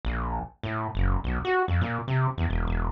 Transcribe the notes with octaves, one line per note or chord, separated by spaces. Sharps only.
A#1
A2
F#1
B1
F#4
F2
A#2
C3
E2
E1
E1